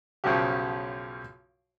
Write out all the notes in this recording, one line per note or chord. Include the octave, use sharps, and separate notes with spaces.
B1 F#2 C#3 F3 F#4 G4